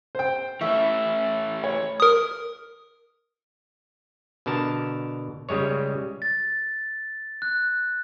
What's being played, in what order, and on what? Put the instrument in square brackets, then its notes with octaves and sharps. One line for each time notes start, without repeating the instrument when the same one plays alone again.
[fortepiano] C5 G5
[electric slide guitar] E3 A3 E4 [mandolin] C#4 E5 [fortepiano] C#6
[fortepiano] C#5
[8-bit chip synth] A#4 D#6
[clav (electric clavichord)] B2 D3 A#4 A5
C#3 G3 G#3 C#5
[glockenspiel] A6
F#6